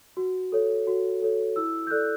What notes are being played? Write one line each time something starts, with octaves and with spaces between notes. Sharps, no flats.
F#4
A4 C#5
F#4
A4 C#5
E4 E6
G6
A4 D5 F#6